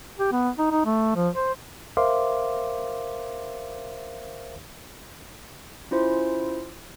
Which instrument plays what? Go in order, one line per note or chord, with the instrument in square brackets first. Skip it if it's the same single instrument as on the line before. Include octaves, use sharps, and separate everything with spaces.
[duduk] G4
B3
D#4
D#4
A3
F3
C5
[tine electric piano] A#4 C5 E5 F5 C6 D6
[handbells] C#4 E4 F4 C5